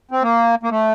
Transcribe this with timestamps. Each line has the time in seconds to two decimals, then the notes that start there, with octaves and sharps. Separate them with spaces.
0.11 C4
0.22 A#3
0.63 A#3
0.70 A3